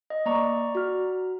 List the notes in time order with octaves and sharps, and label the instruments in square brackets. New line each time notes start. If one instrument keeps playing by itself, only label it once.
[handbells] D#5
[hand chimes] A#3 [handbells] D5 A#5 C#6
[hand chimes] F#4 F6